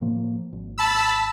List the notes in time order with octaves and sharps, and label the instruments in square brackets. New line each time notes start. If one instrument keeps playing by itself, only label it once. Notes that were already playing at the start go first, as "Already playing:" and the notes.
[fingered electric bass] A2 F3 A#3
G#1
[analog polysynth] A5 B5 E6